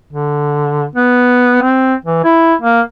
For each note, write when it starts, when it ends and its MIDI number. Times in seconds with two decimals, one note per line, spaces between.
0.13 0.86 50
0.95 1.60 59
1.62 1.94 60
2.05 2.21 52
2.24 2.55 64
2.62 2.81 58